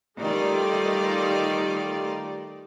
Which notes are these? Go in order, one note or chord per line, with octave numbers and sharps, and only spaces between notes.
D#3 G3 A3 F4 D5